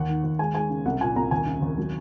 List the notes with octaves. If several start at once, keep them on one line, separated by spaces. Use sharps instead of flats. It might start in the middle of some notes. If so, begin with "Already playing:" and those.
Already playing: D#2 F#5
D#3
D#2
G#3 G#5
G#3 G#5
C#3
C2 F#5
A#2 G#5
C2 A#5
D#2 G#5
C#3
D#2
F#3